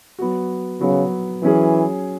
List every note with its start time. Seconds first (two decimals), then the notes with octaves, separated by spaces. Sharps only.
0.19 F#3 B3 F#4
0.81 C#3 F#3 B3 F#4
1.43 E3 F#3 C#4 G#4